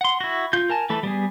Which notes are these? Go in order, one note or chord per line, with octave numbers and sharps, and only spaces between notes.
F#5 C6
E4 F#4
F4 G6
A#4 G#5 A5
E3 A3 A4 B4
G3 B3 G#4